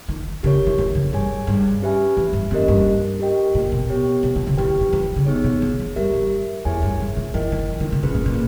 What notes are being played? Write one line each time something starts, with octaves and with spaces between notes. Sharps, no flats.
D#3
C#3 G4 A#4 C#5
E3
D#3
C#3
G2 G#4 C#5 G#5
G2
C#4 G4 B4 E5 G#5
E2
G2
E2 A#3 C#4 G4 A#4 D#5
G2
G4 A#4 D#5 G5
A#2
B2
B3 G4 C#5 G5
B2
B2
C#3
D#3 E4 G4 B4 G5
E3
D#3
E3
D#3
C#3
B3 D#4 G#4 C#5
B2
D#3
E3
G2 G4 A#4 E5
G2
E2 E4 G#4 C#5 E5 G#5
G2
G#2
A#2
E3 E4 A#4 D#5 G5
D#3
D#3
D#3
C#3
B2 C#4 G#4 B4
A#2
A#2